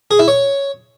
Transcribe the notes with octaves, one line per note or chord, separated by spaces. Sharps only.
G#4
E4
C#5